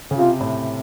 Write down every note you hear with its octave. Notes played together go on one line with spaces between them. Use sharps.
C#3
C3 F4
A2